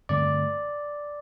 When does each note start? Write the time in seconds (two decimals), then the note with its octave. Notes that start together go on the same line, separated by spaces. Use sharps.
0.09 G2 D3 A3 C4 D5